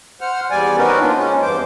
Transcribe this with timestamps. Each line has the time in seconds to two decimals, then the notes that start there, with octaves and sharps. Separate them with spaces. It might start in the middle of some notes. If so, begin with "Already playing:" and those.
0.21 C5 F#5 F6
0.51 E2 G3 D5 G#5
0.77 C4 C#4 D#4 F#4 A#4 B4
1.00 A#3 D4 F4
1.16 C#3 G#3 C#4
1.42 E2 G2 E3 C5 D6